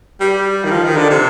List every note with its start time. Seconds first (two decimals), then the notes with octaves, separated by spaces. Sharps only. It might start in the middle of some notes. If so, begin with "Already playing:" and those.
0.20 G3
0.64 D#3
0.71 F3
0.84 D#3
0.97 D3
1.10 C3